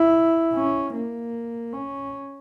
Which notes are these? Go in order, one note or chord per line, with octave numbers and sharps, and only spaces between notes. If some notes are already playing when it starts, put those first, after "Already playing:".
Already playing: E4
C#4
A#3
C#4